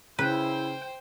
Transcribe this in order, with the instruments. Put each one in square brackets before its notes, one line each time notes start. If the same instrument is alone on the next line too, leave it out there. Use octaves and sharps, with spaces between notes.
[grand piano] C#3 [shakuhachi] E4 [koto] B4 [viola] C5 G5